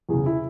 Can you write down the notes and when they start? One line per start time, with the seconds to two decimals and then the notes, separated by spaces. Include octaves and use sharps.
0.09 E2 C#3 G#4
0.26 E4